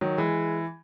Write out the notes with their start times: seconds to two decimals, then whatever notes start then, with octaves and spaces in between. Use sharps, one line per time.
0.01 D#3 F#3
0.18 E3 G#3